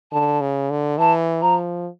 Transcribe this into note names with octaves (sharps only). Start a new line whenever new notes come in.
D3 A5
C#3
D3
E3 A5
F3 A#5